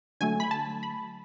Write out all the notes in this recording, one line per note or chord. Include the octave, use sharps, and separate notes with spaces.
D3 F#3 A3 G#5
B5
A5
B5